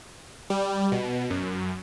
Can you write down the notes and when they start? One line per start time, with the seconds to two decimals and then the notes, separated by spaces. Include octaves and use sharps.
0.50 G3
0.92 B2
1.30 F#2